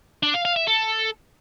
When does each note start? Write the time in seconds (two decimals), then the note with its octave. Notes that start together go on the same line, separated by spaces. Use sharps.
0.23 D4
0.34 F5
0.45 F5
0.56 E5
0.67 A4